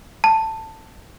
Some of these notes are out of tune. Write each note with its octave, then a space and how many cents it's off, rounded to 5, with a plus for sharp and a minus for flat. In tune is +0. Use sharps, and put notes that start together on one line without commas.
A5 +10